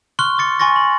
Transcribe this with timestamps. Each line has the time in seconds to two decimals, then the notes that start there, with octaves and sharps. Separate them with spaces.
0.19 C6 C#6 F6 F#6 G7
0.38 D6 A6 C#7
0.59 G#5 C6 C#6 A6 A#6
0.76 F#7